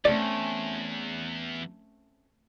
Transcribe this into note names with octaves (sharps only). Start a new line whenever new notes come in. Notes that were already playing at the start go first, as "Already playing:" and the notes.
E2 A3 C4 C#4 D5